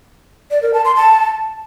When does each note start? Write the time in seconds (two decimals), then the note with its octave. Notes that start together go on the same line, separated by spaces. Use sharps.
0.51 D5
0.62 A#4
0.74 A5
0.85 C6
0.96 A5